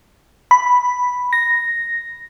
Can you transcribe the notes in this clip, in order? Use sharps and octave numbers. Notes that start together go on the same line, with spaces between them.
B5
A#6